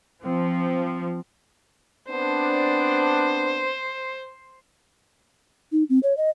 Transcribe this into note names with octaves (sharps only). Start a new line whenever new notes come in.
F3 C4
B3 C4 D4 C5
D#4
C4
C#5
D#5